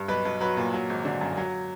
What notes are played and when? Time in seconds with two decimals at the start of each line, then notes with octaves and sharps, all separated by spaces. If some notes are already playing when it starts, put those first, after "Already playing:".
Already playing: G2
0.08 B1 B4
0.25 B1
0.40 F#3 B4
0.57 A#2
0.73 F#3
0.90 G#1
1.05 D3
1.21 F#2
1.37 F#3